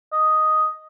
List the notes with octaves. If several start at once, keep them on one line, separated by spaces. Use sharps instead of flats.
D#5